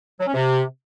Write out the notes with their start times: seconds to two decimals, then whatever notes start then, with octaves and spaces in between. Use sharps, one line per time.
0.20 F#3
0.27 C#4
0.34 C3